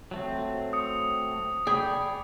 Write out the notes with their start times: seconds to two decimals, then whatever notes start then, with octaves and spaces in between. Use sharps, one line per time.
0.11 F#3 A3 C4
0.73 D#6 C#7
1.67 G#4 D5 G5 B5